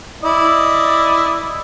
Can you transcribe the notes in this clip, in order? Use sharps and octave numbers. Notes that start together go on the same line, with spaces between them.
E4 D5 D#5